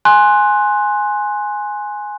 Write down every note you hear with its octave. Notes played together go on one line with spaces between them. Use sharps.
G#5 C6 F#6